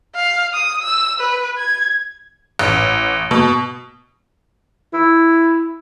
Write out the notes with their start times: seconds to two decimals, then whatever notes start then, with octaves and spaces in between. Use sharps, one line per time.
0.15 F5
0.54 D#6
0.83 E6
1.20 B4
1.58 G#6
2.59 A1
3.31 B2
4.93 E4